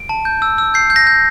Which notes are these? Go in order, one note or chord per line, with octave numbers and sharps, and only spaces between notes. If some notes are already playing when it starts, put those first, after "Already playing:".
Already playing: D7
A5
G6
E6
E6
G6 C7
G6
A#6
G6